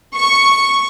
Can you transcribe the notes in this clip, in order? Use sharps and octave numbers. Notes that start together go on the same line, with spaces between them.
C#6